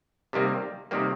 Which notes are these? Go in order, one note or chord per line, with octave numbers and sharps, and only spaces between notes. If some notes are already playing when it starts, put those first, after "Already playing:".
C3 D#3 G3 A#3
C3 D#3 G3 A#3